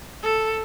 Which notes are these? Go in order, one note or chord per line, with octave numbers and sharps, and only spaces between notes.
A4